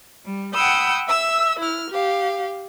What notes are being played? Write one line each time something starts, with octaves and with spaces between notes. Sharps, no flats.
G3
F#5 G5 B5 D#6 E6 G6
E5 E6
E4 F6
G4 F5